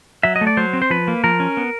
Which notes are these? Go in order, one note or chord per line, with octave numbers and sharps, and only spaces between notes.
F#3 E5
D#5
A3
D5
F#3 C5
C4
C5
F3 B4
A#3
F3 A#4
C#4
B3